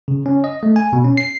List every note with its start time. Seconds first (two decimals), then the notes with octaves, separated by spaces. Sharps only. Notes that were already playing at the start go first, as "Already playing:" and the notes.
0.08 C#3
0.26 C#4
0.44 D#5
0.63 A3
0.76 G#5
0.93 B2
1.04 C#4
1.17 C7